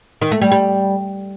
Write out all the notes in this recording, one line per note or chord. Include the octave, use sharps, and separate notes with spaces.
D#3
A3
G3
G3